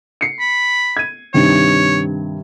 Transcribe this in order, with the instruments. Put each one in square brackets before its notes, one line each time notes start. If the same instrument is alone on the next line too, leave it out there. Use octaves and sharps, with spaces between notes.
[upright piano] C7 C#7
[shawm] B5
[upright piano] G#6 D#7
[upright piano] G2 C3 D#3 [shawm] C#5